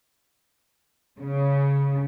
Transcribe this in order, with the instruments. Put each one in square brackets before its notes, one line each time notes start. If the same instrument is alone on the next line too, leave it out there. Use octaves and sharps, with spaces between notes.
[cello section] C#3